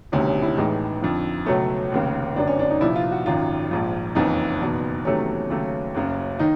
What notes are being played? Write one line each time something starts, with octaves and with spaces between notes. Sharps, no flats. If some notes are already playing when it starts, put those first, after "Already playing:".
E1 D2 C3 D#3 G3 C#4
C#4
E4
A1 A2 E3 G#3 D#4
F2 D3 F3
C#2 B2 F#3 A3 C#4
F1 D#2 C#3
G1 F#2 D3 D4
C#4
D4
D#4
C2 A#2 F3 E4
F4
F#4
G#1 F#2 D#3 F4
A#1 G#2 F3
F#1 F2 C#3 E3 D#4
F#1 E2 B2
E2 C3 D#3 F#3 A3 C#4
D#2 C#3 F#3 A3
F#1 F#2 C#3
D#3 D#4